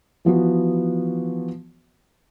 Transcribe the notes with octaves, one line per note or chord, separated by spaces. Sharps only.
E3 F3 B3 F#4